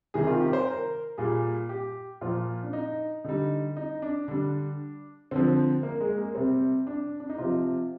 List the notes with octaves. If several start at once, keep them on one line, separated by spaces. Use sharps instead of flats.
C3 D#3 G3 G#4
F4
G4
C5
A#4
A#2 G3 G#4
G4
A#2 F3 F4
D4
D#4
D3 G3 D#4
D#4
D4
D3 G3 D4
D3 F3 C4
A#3
G#3
A#3
C3 G3 C4
D4
D4
D#4
C3 F3 F4